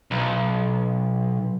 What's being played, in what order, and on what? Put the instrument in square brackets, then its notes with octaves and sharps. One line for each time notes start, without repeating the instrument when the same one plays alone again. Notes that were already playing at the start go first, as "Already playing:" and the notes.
[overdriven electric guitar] B1